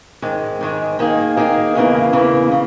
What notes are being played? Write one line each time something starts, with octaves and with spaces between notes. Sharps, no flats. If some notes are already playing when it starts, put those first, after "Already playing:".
G#2 D#3 G#3
G#2 D#3 G#3
D#3 A#3 D#4 G#4
D#3 A#3 D#4 G#4
E2 C#3 E3 A#3
E2 C#3 E3 A#3
C#3